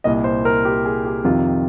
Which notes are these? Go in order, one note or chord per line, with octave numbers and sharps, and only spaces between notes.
C2 A#2 D#5
C5
A#4
G4
G#4
G4
F2 C3 D#3 F4